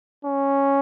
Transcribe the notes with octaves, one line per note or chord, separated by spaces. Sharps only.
C#4